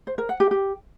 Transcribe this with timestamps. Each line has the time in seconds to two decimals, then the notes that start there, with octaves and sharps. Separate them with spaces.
0.07 C5
0.18 A#4
0.29 F#5
0.40 G4
0.51 G4